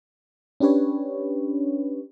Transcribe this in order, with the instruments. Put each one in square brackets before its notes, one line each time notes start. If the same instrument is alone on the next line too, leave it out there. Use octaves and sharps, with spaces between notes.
[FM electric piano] C#4 D4 G4 B4 C#5